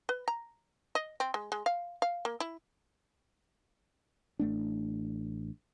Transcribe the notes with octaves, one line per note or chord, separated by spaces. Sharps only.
B4
A#5
D#5
C4
G#3
G#3
F5
F5
A#3
E4
A1 A3 D4